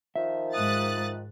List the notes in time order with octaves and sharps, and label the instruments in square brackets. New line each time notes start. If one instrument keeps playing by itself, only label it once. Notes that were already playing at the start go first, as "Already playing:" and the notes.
[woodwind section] D#3 F3 [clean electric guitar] E5
[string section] G#2 F#6 A6 [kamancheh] D#6